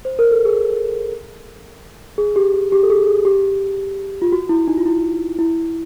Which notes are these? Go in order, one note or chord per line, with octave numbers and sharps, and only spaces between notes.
C5
A#4
A4
G#4
G#4
G4
G4
G4
A4
G#4
G#4
G4
F4
F#4
E4
D#4
F4
E4
E4